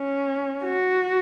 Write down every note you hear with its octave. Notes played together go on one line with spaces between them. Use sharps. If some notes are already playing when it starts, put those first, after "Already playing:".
Already playing: C#4
F#4